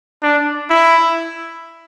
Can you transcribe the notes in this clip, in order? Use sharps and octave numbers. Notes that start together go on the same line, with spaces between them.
D4
E4